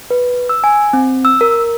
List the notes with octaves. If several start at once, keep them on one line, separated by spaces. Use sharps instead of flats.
B4
E6
G#5
C4
E6
A#4